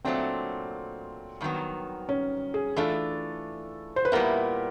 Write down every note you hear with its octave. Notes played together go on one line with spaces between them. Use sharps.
A#2 F#3 A3 C4 D4
G2 D#3 F#3 B3
C#4
G#4
E3 A3 D4 F4 A4
C5
B4
A#2 G3 B3 E4 A#4